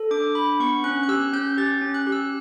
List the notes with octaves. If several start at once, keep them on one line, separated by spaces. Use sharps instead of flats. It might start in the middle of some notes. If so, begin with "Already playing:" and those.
Already playing: A4
D4 D6
D4 B5
B3 C#6
C#4 F#6
F#6
G4 E6
C#4 G6
G4 A6
C#4
F#6
G4
E6